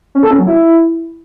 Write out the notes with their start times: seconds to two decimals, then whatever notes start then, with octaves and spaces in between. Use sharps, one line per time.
0.15 C#4
0.23 A4
0.31 C#4
0.39 F#3
0.47 E4